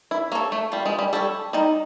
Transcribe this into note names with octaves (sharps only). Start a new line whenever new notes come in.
E4
A#3 A4 C#5
A3
G3 F4
G#3
G3
G3 A4 C#5
G3 D#4